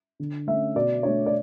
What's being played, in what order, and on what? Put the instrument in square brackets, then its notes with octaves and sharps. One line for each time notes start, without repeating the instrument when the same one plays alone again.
[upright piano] D3
A3 C#4 E5
B2 D5
A3 D4 C#5
D5